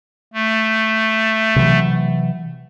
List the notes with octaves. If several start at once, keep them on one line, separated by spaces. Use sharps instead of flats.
A3
C3 E3 F#3